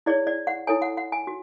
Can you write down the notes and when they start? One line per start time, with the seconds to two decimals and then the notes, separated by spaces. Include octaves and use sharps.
0.06 E4 G#4 C#5 D5
0.27 D5
0.47 F#5
0.67 E4 A4 C#5 G#5
0.82 F#5
0.97 F#5
1.12 G#5
1.27 F#4